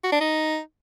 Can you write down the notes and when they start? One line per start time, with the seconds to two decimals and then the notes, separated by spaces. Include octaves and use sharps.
0.04 F#4
0.12 D4
0.21 D#4